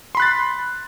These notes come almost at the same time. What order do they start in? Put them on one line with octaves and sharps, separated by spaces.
C6 B5 F#6 A6